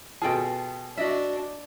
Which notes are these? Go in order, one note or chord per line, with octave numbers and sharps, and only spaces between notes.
B2 F4 G#4 A4 G5
D4 F#4 D#5 E5